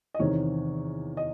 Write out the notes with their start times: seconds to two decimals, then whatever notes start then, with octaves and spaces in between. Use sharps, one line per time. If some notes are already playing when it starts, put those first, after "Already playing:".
0.14 D#5
0.19 E2 C3 D#3 C#5
1.17 D#5